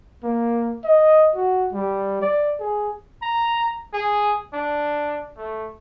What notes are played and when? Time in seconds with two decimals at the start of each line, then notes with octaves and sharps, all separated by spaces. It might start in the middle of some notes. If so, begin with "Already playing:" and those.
0.23 A#3
0.84 D#5
1.36 F#4
1.73 G3
2.22 D5
2.60 G#4
3.23 A#5
3.94 G#4
4.53 D4
5.37 A3